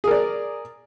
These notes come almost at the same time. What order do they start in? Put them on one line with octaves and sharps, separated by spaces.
G#4 A#4 D5